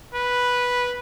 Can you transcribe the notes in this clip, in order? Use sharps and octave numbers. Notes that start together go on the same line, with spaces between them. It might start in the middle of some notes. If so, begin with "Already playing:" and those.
B4